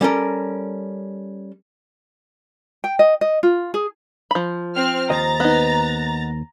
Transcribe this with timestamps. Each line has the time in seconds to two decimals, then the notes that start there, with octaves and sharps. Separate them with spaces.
0.01 G3 C#4 A4 A#4
2.84 G5
2.99 D#5
3.21 D#5
3.43 F4
3.74 G#4
4.31 F3 B5
4.75 C4 F6
5.10 D#2 C5 D#5 A#5 A6
5.40 B3 D#4